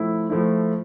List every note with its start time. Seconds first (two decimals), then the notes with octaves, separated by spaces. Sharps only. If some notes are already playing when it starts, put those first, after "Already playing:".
Already playing: A2 F3 A3 E4
0.29 A2 F3 A3 E4